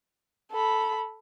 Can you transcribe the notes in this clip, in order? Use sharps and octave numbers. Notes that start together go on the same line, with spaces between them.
A4 B5